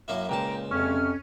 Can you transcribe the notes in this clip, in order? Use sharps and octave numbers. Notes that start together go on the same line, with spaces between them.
F#2 A#3 E4
C#2 A#2 G5 A5 A#5
F2 C3 C#4 F6